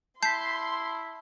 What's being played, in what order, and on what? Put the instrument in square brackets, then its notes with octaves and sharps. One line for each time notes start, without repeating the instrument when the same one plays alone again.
[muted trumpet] E4 [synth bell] A5 B6 [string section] C6 [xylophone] G6 C7